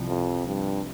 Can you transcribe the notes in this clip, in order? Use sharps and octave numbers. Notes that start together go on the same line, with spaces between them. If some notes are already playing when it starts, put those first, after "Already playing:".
Already playing: C2 C3 F3
F2
G2